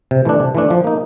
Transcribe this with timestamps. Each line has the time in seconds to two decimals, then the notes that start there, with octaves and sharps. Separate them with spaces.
0.11 C3
0.25 E3 A3 D4
0.40 C3
0.55 E3 A3 D4
0.71 F3
0.84 A#3 D#4